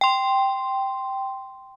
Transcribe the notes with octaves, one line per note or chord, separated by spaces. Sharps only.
G5 C6